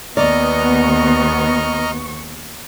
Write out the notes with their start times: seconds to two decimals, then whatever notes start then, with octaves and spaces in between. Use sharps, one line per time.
0.17 D#2 B3 D5 D#5 A#5 C#6 F6